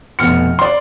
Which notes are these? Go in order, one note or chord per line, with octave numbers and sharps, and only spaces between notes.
F1 B2 F6 C#7
D5 C6